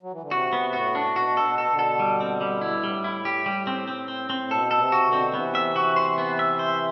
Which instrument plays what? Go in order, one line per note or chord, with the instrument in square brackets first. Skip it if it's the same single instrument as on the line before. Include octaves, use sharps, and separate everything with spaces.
[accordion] F#3
E3
D3
[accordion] C3 [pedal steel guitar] F#4
[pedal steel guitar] B3
[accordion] A2 [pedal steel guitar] F#4
[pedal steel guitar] D4
[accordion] B2 [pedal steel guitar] F#4
[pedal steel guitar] A4
[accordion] B2
[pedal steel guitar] A4
[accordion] B2 D3
[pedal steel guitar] A4
G3
C4
G3
E4
[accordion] A2 [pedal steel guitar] G3
[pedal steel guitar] E4
G4
G3
C4
C4
C4
C4
[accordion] B2 [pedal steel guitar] A4
[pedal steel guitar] A4
[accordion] C3
[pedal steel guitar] F#4
[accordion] B2 D3
[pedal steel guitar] C4
[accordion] C3 E3 [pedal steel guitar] B3
[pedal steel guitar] E5
F#4
C5
B3
E5
C5